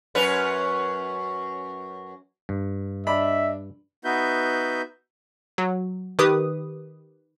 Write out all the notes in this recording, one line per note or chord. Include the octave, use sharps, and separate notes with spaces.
F#2 C#4 B4
G2
D4 D#5 E5 B5
B3 D#4 F#4 B4 E5 G6
F#3
D#3 G4 B4 D#6